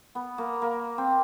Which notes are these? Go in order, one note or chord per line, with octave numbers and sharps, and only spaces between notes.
B3
A#3
A#3
C4